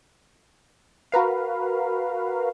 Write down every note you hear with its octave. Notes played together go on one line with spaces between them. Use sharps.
F#4 A#4 B4 F5